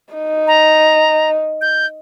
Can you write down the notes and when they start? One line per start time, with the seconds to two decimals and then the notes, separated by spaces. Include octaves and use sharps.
0.14 D#4
0.47 A#5
1.61 G6